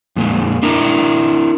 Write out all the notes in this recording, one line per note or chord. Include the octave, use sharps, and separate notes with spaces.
F2 A#2 G#3
D4 E4 A#4